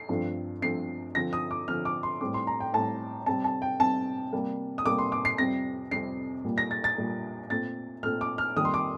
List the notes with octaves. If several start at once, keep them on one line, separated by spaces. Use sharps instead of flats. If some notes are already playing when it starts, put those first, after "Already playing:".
Already playing: C7
G2 F3 A3 C4
G2 F3 A3 C4 C7
D3 F3 C4 A#6
D#6
D6
D3 F3 C4 F6
D6
C6
A2 G3 C4 D6
C6
A#5
G5
A2 G3 C4 A5
C3 G3 C4 A5
A5
G5
C3 G3 C4 A5
C3 G3 A#3
D#6
C3 G3 A#3 D6
C6
D6
C7
F2 C3 G3 C4 A#6
F2 C3 G3 C4 C7
A#2 G3 A#3
A#6
A6
A6
A#2 G3 A#3
A#2 A3 C4 A6
A#2 A3 C4 F6
D6
F6
F2 D#3 G3 A#3 D#6
C6
D6